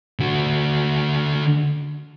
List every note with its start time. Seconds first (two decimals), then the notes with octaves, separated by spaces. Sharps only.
0.20 D3 F#4